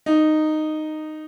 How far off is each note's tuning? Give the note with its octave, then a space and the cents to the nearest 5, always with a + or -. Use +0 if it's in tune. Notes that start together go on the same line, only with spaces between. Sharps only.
D#4 -10